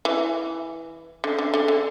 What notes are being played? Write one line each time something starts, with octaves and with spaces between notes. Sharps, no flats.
E3
D3
D3
D3
D3